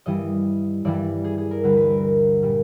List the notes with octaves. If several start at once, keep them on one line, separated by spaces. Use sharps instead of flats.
G2 E3 G3 D#5
G2 E3 G3 D5
G#4
G#4
A#4
D2 D3 G3 B4
B4
A#4
A#2 G3